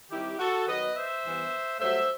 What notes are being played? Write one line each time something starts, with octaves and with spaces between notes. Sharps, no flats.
D#3 G3 C4 E4 G4
F#4 A4
D#3 F#3 B3 B4 D#5
C5 E5
G2 E3 B3
G2 F#3 A3 C5 E5